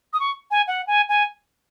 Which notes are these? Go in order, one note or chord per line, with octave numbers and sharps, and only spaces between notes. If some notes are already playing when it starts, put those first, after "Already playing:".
D#6
C#6
G#5
F#5
G#5
G#5